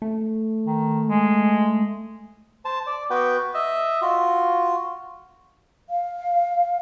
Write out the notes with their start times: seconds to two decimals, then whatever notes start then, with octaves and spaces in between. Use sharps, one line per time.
0.02 A3
0.66 D#3
1.07 G#3
2.65 C5 A5
2.87 D5
3.10 B3 F#4 B4 G5
3.54 D#5 E5
4.02 F4 F#4
5.90 F5